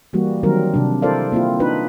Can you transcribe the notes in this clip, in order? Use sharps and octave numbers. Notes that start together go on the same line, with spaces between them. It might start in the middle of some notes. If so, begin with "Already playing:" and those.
E3 G3 A#3 F#4
D#3 F#3 G3 C4 A#4
C3 D4
E4 A4 A#4 C5 D5 F5
A#3 C4 E4 F4
D4 D#4 F4 B4